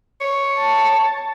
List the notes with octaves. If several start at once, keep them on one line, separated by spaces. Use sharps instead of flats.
C#5
A5